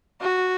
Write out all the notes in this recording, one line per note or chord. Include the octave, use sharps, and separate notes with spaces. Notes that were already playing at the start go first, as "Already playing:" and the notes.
F#4